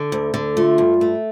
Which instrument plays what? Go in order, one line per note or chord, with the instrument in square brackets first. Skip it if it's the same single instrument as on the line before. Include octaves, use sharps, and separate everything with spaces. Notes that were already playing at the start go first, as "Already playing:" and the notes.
Already playing: [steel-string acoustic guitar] D3
D2
D3
[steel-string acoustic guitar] A3 [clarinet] F4
[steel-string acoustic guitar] G2
A3